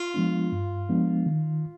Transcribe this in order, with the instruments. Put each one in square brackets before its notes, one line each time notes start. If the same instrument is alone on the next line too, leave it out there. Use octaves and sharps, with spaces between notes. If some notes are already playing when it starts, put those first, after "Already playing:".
Already playing: [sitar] F4
[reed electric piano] F3 G#3 B3 D4
G2
F3 G#3 B3 D4
D#3